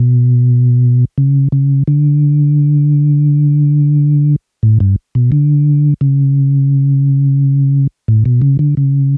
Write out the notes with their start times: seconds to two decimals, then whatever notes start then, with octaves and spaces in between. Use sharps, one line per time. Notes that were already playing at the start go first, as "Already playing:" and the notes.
Already playing: B2
1.18 C#3
1.52 C#3
1.88 D3
4.63 A2
4.80 G2
5.15 B2
5.32 D3
6.01 C#3
8.08 A2
8.26 B2
8.42 C#3
8.59 D3
8.77 C#3